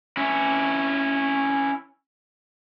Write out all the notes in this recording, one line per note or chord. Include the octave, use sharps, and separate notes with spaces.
C#4 E4